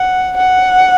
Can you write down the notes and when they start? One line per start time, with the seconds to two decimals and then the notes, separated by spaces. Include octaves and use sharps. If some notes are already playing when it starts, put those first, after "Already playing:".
Already playing: F#5
0.37 F#5